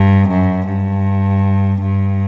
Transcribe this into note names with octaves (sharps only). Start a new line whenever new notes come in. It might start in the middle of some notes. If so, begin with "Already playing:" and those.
Already playing: G2
F#2
G2
G2